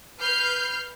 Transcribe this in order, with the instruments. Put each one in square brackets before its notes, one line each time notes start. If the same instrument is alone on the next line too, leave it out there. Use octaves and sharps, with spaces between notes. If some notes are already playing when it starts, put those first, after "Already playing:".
[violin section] B4 F6 G6 C7